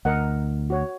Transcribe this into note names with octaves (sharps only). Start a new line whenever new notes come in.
D2 A#4 D#5 F#5
F#4 C#5